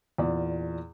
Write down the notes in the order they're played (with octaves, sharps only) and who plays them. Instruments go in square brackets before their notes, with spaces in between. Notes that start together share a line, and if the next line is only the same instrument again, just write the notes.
[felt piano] E2 A#2 D5